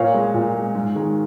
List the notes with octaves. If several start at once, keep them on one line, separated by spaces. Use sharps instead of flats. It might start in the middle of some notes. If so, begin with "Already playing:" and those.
Already playing: A#2 C#5 F5
G#3
A#2
G#3
G#2
D#3 G#3